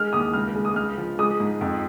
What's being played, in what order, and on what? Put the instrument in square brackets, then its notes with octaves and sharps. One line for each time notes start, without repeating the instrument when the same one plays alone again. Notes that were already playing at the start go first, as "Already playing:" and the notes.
Already playing: [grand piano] G#3 F6
D#2 D#6
C#2 F6
G#3
D#6
C#2 F6
F3
G#3 D#6
G#2
F2